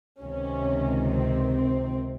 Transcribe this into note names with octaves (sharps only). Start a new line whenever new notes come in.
C#2 C3 D#3 C#4
C4
C4